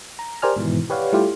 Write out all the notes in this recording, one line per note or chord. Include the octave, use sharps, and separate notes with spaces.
A#5
G4 A#4 C5 D5 G#5 F6
G#2 B2 D#3 E3
G4 B4 C#5 D5 F5 F#5
G3 A3 E4 F4 G4